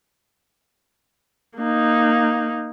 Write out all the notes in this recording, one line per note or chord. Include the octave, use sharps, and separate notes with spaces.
A#3 D#4